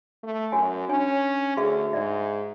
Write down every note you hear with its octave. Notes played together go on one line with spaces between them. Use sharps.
A3
F#2 F#4 C#5 G#5
C#4 D4 C#5 G#5
D2 F#4 G#4 E5
G#2 D5 E5